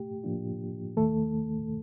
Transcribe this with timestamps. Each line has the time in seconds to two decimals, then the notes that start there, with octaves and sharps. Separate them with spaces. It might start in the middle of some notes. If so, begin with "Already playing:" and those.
Already playing: A3 G4
0.24 A2 F3 A#3 D4 F4
0.97 D#2 D#3 A3 A4